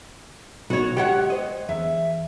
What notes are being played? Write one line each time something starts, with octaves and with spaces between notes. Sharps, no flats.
B1 B2 F#4 C#5
G#3 G4 C#5 F#5
C5 D#5
E2 E5